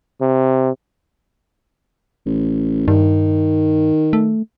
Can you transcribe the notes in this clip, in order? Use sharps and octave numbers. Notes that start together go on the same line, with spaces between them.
C3
A1
G2 D#3
A3